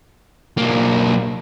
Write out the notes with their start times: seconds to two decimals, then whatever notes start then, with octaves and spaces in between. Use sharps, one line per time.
0.57 B1 A#3